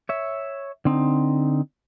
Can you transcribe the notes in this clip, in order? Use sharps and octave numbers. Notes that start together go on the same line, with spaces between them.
C#5 E5
D3 C4 D#4